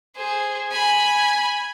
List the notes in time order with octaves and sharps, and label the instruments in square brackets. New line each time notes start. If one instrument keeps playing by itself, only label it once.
[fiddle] G#4 C5
G#5 B5